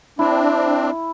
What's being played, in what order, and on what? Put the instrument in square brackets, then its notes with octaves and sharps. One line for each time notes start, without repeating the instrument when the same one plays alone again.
[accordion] C4 D4 [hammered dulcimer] E4